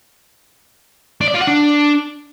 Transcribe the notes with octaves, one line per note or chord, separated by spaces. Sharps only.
D4
D5
F4
F#5
D4